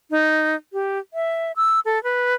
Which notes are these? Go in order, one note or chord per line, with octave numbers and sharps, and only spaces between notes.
D#4
G4
E5
E6
A4
B4